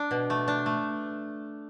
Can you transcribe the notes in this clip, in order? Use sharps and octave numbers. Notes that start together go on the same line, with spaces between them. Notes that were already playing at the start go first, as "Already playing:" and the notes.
Already playing: D4
B2
A3
D4
A3